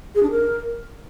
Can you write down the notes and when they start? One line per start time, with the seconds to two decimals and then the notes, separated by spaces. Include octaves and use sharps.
0.15 G#4
0.23 D4
0.31 A#4